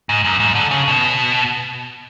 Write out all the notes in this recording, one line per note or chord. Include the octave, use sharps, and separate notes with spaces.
G#2
F#2
G#2
D3
C#3
B2